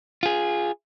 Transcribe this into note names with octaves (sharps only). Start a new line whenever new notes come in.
F4 G#4